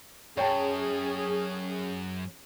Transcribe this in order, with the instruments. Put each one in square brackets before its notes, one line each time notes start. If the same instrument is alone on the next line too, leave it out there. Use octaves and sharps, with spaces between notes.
[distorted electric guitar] F#2 [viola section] C#4 G#4 [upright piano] C#5 G5 A5